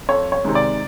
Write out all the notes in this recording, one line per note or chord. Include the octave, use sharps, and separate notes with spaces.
F2 C#5
C#5
C3 D#3 G#3
D5